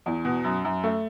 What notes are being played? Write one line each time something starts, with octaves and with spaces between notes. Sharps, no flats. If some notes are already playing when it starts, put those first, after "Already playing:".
E2
B2
F#2
F#2
A3